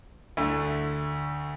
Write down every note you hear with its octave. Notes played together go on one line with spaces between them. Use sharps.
D2 D3 A3 E4